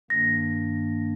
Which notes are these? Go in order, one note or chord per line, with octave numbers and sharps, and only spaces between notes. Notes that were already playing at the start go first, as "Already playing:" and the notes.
G2 D#3 A#3 D4 A#6